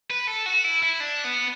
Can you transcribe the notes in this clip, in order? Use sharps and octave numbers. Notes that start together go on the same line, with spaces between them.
B4
A4
F#4
E4
E4
D4
B3